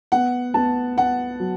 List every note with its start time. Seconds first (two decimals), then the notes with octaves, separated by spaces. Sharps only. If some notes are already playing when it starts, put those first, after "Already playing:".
0.12 B3 F#5
0.54 B3 A5
0.97 B3 F#5
1.40 F#3